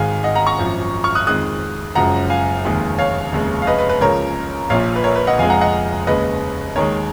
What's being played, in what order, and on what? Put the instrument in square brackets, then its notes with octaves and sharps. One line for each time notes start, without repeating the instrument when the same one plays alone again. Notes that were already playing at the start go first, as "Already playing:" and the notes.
Already playing: [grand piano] G#1 G#2 D#3 G#3 F5 G#5
D#5 F#5
F#5 A#5
A#5 C#6
G#1 F#2 F3
C#6 F6
D#6 F#6
F2 D#3 G#3 D#6 F#6
F#1 F#2 C#3 F3 G#3 F#5 A#5
F5 G#5
F1 D#2 D#3 G#3
C#5 F5
F1 D#2 C#3 G#3
F5
B4 D#5
B4
B4
C#2 C#3 F3 A#4 C#5
A#1 A#2 F3 C#5 F5
B4
A#4 C#5
B4
D#5 F#5
F1 F2 F3 G#3 F5 G#5
F#5 A#5
D#5 F#5
D#2 C#3 G#3 B4 D#5
D#2 D#3 G#3 A#4 C#5